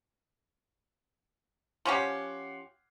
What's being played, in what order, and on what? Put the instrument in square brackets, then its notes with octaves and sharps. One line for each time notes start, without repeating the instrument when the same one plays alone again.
[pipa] F3 C#4 G4 [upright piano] C#5 F#5 C6